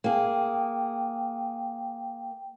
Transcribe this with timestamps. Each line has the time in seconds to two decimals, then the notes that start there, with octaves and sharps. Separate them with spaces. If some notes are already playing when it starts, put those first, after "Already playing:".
0.04 A#3 G#4 G5